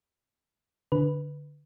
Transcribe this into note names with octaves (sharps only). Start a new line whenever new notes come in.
D3 B4